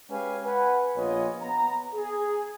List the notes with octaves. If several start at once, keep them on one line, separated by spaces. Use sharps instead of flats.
G#3 C#4 G4 B4 F5 G#5
B4 F#5 G#5
A#1 B3 F4 C#5 D#5 G#5
B3 A#5
G#4